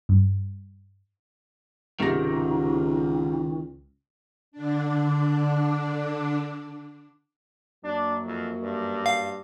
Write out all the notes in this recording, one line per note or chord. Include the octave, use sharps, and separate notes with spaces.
G2
C#2 G#2 C3 D#3 A#6
D3 D4
F#2 F#3 A#3 D4
F2
G2
F5